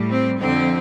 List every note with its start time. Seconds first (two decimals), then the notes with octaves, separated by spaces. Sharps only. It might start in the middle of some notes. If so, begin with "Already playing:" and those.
Already playing: A2 G3
0.10 C4
0.38 F2 D3 F3 C4